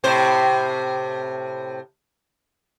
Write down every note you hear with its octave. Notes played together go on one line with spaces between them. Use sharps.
A2 C3 C5